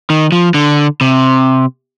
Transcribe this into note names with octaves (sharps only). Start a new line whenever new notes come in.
D#3
F3
D3
C3